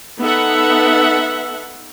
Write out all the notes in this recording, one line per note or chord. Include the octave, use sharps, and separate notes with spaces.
B3 D#4 A4 E5 F#5